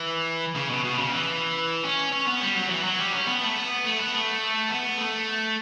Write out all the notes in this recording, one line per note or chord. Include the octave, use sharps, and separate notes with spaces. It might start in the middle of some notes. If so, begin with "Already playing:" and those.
Already playing: E3
C#3
B2
B2
C#3
E3
C#4
C#4
B3
G3
F#3
E3
F#3
G3
C#4
B3
A3
B3
A3
B3
A3
B3
A3